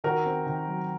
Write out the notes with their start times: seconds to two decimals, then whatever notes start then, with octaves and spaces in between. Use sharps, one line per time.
0.04 D#3 F#4 A#4
0.25 C4
0.47 D#3
0.66 F#3